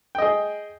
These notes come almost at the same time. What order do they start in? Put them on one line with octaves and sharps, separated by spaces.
G5 D#5 G#4